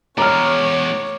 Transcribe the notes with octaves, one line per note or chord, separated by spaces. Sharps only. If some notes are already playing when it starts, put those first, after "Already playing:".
E2 G#3 C#5 A#5 D6 F6